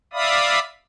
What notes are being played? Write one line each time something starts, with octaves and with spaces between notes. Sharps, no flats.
D5 E5 F5 B5 D#6